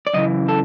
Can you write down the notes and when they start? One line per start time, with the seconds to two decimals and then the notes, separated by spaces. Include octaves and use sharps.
0.07 D5
0.13 F#2 C#3 E3 D#5
0.48 A4